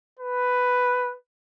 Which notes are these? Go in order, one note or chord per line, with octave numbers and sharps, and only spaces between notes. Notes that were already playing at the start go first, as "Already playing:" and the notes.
B4